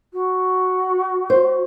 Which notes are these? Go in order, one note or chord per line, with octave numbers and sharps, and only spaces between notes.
F#4
C5